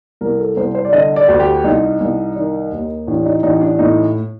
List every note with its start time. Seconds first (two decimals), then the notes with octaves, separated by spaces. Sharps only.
0.21 C2 A#4
0.39 A4
0.57 C2 C5
0.75 C5
0.85 D5
0.92 D3 D#5
1.16 D5
1.28 D2
1.40 G4
1.64 C2 D#4
2.01 C2
2.36 D#3 D#4
2.72 D#2
3.07 A1 D4
3.25 D#4
3.43 A1 D#4
3.61 D4
3.79 A2 D#4